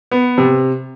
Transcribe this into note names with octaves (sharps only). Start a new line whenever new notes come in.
B3
C3